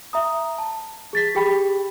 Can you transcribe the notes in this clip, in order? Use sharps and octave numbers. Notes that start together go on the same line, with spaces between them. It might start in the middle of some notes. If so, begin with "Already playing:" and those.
E5 A#5 D#6
A5
G#4 A6 B6
G4 G#4 G5 B5 B6